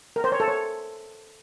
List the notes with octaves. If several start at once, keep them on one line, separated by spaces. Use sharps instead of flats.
A#4
C5
C#5
A4
C#5